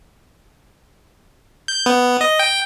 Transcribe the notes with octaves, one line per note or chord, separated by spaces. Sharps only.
G6
B3
D#5
G5